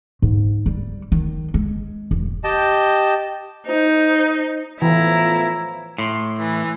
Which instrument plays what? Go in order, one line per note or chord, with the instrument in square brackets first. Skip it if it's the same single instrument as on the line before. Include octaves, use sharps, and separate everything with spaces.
[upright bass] G#2
G3
D#3
G#3
E1
[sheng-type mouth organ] G4 D#5 G5 A5
[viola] D#4 [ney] C5
[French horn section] A2 F3 B3 [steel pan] E3 [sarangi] E4 [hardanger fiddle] A#5
[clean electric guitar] A2 [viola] C6
[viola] E3